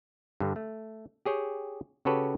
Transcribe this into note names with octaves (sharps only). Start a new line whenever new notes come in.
G2 D3
A3
G4 G#4 C#5 G5
C#3 F#4 G4 A4 B4 C#5